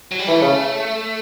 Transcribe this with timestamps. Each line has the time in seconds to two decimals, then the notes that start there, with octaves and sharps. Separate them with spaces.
0.12 F#3
0.19 G3
0.28 E3 A3
0.42 C#3